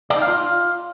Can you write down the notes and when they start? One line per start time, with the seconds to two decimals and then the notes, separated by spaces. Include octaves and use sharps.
0.10 D5
0.16 D#4
0.22 F5
0.28 F4